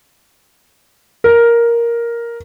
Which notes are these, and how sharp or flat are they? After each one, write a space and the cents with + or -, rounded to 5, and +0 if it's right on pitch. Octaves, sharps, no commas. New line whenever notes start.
A#4 +5